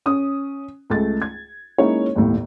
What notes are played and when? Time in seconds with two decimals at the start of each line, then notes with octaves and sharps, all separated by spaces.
0.06 C#4 D#6
0.90 C#2 A3 A6
1.22 G#6
1.78 G#3 A#3 C#4 D#4 E4 C#5
2.15 G1 D#2 A2